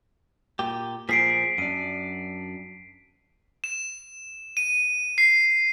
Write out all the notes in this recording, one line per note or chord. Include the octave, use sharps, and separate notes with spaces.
A#2 G4
A#2 F3 G#4 B6 C7 D7
F#2 D4 D#7
E7
D#7
C7